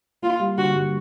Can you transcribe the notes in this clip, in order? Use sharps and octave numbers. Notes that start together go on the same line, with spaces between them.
A#3 F4
G3
D3 F#4
G2